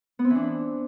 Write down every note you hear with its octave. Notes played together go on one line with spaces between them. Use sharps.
B3
C4
E3
D4